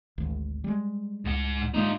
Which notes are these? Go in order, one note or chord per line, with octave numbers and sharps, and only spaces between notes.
G#1 D2
G3 G#3
C#2 G#2 F#5
G#2 G#3 A#3 D#4 F4